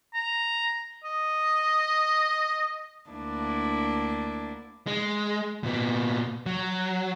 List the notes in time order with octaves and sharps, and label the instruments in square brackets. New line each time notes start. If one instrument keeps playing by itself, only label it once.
[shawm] A#5
D#5
[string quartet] D2 A#3 D4 E4 A5
[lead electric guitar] G#3
A#2 B3
F#3